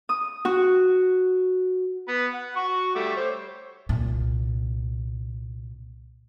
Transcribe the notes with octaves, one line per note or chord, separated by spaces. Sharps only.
D#6
F#4
B3 B4
F#5
F#4 C#6
G3 A3 D6
C5 C#5
C2 A#2